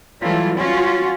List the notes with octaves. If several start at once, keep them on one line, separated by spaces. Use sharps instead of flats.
E3 F#3 G3 A3 E4 F4
C#4 F4 F#4